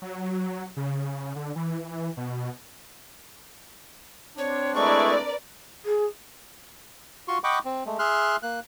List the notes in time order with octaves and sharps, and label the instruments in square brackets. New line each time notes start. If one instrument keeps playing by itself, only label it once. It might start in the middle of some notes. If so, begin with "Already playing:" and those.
[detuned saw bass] F#3
C#3
D3
E3
B2
[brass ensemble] C4 D4 [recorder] C#5
[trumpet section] G#3 A3 E4 [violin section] A#4 B4 D5 [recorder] C#6
[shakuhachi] G#4
[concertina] F4 F#4 C6 C#6
D#5 F#5 G5 B5 C#6 D6
C4
G#3 A3
G#4 E5 C6 F6 F#6
A#3 F#6